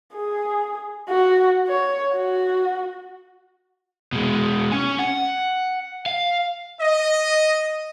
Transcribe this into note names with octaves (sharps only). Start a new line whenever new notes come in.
G#4
F#4
C#5
F#4
B2 G#3
C#4 G#5
F#5
F5
D#5